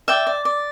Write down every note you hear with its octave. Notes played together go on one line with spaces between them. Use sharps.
D5 E5 G5
D5
D5